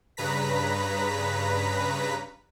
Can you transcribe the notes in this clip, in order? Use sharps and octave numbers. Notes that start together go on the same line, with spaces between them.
G2 C#3 B4 A#5 B6